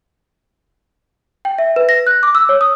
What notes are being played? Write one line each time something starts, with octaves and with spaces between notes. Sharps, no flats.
G5
E5
B4
A#6
F#6
D6
E6
C#5
D#6